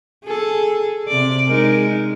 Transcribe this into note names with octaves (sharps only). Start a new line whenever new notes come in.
G#4 A4
C3 D5
G#3 D#4 A#4